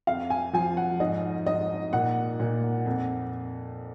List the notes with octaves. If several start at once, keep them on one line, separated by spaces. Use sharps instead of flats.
F2 F5
G#5
F3 G#5
F#5
G#2 D#5
G#2 D#5
A#2 F#5
A#2
F2